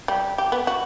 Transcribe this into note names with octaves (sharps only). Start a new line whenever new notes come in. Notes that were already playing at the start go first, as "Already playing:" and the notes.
G3
G4
B3
F#4